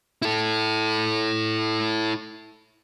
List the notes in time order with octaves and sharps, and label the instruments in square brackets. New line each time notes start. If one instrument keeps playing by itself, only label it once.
[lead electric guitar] E4 A4